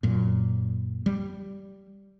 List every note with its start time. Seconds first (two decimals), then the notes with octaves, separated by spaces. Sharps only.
0.03 F#2 A#2
1.06 G3